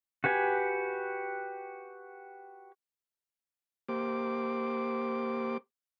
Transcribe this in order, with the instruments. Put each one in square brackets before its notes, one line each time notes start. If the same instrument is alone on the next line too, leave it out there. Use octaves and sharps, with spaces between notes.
[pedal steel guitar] F#4 G4 B4 G#5
[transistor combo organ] A#3 G4 C5 D6